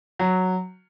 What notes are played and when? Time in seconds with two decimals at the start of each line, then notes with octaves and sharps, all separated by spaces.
0.19 F#3